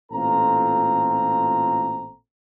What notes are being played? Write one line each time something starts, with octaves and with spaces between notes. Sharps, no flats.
A1 A#2 C4 F4 A4 A#5